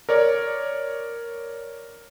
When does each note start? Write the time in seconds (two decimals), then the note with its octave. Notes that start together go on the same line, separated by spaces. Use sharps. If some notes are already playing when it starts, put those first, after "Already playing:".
0.09 A#4 C#5 D5